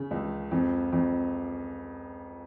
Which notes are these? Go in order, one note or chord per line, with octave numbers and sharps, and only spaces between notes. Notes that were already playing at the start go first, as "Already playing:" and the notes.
Already playing: C#3
C#2
F2
F2